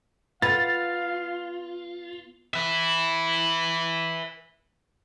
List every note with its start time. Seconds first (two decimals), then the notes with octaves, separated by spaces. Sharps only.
0.42 B3 F4 F5 A6
2.54 B4 E5